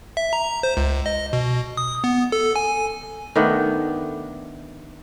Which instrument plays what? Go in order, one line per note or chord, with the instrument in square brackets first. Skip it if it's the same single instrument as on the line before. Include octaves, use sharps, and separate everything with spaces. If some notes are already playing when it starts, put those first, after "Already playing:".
[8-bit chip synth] E5
A#5
C5
C#2
D#5
B2
D#6
B3
A4
G#5
[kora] D#3 A3 B3 D4